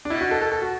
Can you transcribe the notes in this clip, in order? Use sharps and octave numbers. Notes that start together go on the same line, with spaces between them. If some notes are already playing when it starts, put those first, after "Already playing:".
D4
B2 E4
F#4
A4
A4
A4
F#4